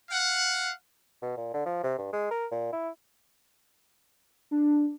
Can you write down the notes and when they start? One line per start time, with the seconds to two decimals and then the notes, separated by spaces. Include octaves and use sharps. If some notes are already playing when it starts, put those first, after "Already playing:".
0.11 F5 F#5
1.22 B2
1.37 A#2
1.54 D3
1.66 F3
1.83 C3
1.98 G2
2.13 G#3
2.31 A#4
2.51 A#2
2.72 E4
4.51 D4